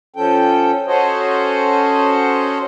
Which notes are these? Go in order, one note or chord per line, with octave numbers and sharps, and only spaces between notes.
F3 C#4 A4 G5
C#4 F#4 A4 C5 C#5 D#5